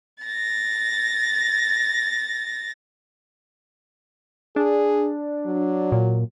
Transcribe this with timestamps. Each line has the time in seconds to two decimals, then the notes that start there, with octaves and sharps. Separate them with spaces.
0.24 A6 A#6
4.56 D4 G#4
5.46 F#3
5.92 A#2